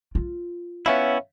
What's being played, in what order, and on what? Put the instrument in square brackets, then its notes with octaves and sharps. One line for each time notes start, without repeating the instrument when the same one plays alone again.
[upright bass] F4
[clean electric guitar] B3 C#4 E4 [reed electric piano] C#5 E5 F5